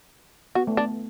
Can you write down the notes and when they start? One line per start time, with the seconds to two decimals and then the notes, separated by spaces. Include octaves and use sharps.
0.55 B3 F#4
0.67 A3
0.77 B3 D4